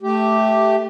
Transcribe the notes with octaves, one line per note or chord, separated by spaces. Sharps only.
A3 G4